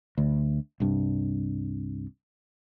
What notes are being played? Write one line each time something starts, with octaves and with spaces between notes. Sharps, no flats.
D2
C2 G2